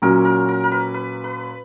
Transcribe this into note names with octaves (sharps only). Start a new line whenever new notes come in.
A#2 F#3 C#4 F#4 A#4
A#4
A#4
A#4
B4
B4
B4